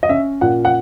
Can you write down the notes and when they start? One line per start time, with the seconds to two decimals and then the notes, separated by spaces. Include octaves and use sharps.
0.03 D#5
0.09 C#4 E5
0.41 A#2 F#5
0.65 F#5